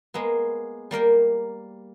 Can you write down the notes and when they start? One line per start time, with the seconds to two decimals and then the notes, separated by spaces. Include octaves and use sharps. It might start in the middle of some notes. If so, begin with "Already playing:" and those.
0.14 G#3 A#3 B3
0.91 G3 A#3 A#4 G5